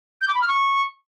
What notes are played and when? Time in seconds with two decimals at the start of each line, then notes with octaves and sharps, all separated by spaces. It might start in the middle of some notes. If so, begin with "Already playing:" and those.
0.21 G6
0.28 D6
0.35 B5
0.42 F6
0.48 C#6